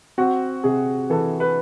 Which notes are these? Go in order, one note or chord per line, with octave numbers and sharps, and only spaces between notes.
C4 F#4
C3 G#4
E3 A4
B4